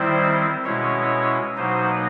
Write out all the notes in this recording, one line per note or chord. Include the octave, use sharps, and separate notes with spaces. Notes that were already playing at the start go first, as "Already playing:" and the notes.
Already playing: D#3 G3 C4 E4 C5
B2 G#3 C#4 E4 C#5
B2 F#3 A#3 D#4 C5